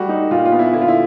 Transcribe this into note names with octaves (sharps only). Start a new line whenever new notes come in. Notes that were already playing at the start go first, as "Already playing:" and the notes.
Already playing: G3 A3 F#4
D#4
A#2 F4
F4
B3
E4
D3 E4
F4
E4